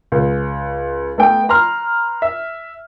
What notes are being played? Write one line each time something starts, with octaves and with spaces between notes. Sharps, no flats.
C#2
A3 B3 G5
B4 A#5 C6 F6
E5